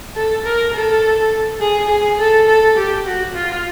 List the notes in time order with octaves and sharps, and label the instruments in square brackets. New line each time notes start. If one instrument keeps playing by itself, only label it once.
[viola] A4
A#4
A4
G#4
G#4
A4
A4
G4
F#4
F4